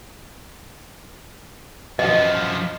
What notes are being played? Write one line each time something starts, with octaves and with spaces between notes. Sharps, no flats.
F#2 F3 D#5